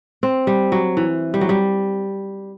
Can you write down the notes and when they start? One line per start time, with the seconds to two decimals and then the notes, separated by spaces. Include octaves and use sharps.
0.23 C4
0.47 G3
0.72 F#3
0.97 E3
1.34 G3
1.41 F#3
1.49 G3